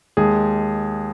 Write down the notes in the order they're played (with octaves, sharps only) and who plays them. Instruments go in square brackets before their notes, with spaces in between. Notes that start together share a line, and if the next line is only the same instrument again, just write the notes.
[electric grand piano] D#2 G#3 G#4